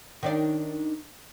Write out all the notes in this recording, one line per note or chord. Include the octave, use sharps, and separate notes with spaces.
D#3 D4 D5